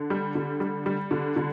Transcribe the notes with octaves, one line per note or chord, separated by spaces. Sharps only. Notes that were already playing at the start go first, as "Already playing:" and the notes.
Already playing: D3
G3
D3
G3
G3
D3
D3